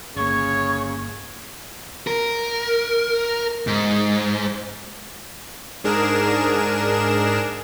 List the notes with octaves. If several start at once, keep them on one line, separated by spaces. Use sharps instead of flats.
G1 C#3 A#3 C#5 C#6
A#4
G#2
G#2 D4 G#4 A#4 E7